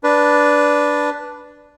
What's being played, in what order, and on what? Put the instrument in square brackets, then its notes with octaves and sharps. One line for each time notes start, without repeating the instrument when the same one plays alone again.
[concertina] D4 B4